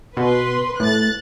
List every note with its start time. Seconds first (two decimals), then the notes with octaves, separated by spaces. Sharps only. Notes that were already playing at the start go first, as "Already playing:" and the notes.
0.17 B2 B4 C6
0.80 A2 F#6 A6